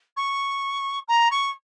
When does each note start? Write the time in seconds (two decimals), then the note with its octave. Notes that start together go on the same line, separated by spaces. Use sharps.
0.17 C#6
1.08 A#5
1.31 C#6